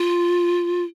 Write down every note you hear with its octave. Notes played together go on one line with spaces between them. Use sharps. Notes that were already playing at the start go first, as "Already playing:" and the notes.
Already playing: F4